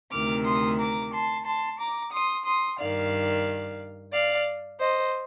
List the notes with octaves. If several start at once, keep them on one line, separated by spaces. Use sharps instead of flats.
D2 C3 D#3 D6 F6
C6 D#6
A#5 D6
A5 C6
A5 C6
A#5 D6
C6 D#6
C6 D#6
G2 D#3 D5 F5
D5 F5
C5 D#5